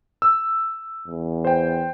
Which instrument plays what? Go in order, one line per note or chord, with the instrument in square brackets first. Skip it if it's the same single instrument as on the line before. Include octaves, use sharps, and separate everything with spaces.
[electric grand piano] E6
[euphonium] E2
[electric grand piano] C5 G5